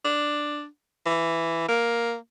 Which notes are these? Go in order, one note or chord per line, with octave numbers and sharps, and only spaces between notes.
D4
E3
A#3